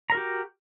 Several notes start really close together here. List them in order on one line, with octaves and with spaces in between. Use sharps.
A#5 A#4 F#4 G4